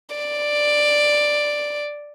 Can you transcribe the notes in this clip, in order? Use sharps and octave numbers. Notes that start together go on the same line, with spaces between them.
D5